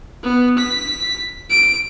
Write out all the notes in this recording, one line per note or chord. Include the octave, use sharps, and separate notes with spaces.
B3
B6
D7